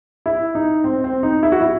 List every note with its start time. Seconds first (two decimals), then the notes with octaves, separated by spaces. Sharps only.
0.26 E4
0.55 D#4
0.84 C4
1.04 C4
1.23 D#4
1.43 E4
1.52 F#4
1.61 E4